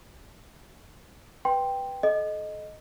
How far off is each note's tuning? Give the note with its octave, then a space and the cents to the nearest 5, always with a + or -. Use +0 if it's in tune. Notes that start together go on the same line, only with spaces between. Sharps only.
B4 +0 G5 +0 C6 +0
A4 -30 D#5 -5